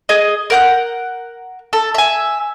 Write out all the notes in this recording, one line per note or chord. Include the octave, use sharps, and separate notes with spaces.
G#4 D#5
A#4 F#5 G6
A4
E5 G#5